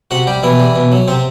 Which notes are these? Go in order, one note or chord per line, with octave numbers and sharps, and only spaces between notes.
C3 F#4 F#5
G3 G4
B2 E3 E4
G3
B2
F#3
C3 C4